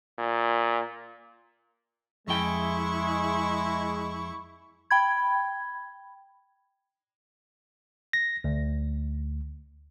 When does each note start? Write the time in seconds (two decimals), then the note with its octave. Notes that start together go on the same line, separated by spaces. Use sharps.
0.18 A#2
2.28 F2 G#3 E4 G#4 E5 G5 C#6
4.91 G5 B5 G#6
8.13 A#6
8.44 D2